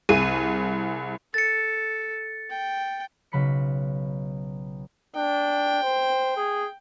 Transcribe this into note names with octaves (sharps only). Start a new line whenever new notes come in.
C2 G#4 D#7
A4 A6 C#7
G5
B1 C#3 F#3 B5 B6 C#7
D4 G5
C5
G#4